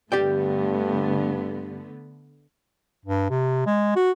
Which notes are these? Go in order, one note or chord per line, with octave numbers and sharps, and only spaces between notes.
G2 D3 A3 B3 G4 D5 G5
G2
C3
G#3
F#4